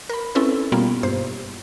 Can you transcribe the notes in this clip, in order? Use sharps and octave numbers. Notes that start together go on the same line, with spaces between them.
A#4 B5
C4 C#4 E4 A4 B4
B2 G3 A#3 B3 F4
G2 C5